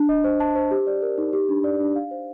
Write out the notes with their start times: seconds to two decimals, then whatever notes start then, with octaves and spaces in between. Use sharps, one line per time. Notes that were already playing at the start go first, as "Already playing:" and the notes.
Already playing: D4
0.09 D#5
0.24 C5
0.40 A5
0.55 C5
0.71 G4
0.87 D5
1.02 A#4
1.18 D#4
1.33 G4
1.49 D4
1.64 D5
1.80 D4
1.96 F5
2.11 C5